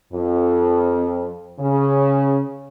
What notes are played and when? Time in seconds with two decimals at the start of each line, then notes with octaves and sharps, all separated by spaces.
0.12 F2
1.60 C#3